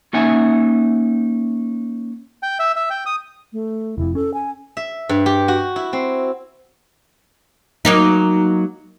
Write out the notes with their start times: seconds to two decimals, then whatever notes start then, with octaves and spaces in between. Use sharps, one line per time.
0.13 A#3 C#4 D#4 E5 F#5 G#5
2.43 G5
2.59 E5
2.76 E5
2.90 G5
3.06 D#6
3.53 A3
3.98 F1 F2 E4
4.15 C#4 A4
4.34 G#5
4.77 E5
5.09 G2
5.26 G4
5.48 F#4
5.76 E4
5.93 C4
7.85 F#3 A#3 D#4